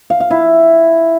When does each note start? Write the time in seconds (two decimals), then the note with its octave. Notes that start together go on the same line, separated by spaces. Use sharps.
0.10 F5
0.20 F5
0.31 E4